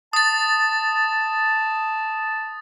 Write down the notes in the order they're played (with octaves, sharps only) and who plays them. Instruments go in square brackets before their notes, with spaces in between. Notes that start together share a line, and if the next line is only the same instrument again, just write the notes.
[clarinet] A5 [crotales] D#6 A6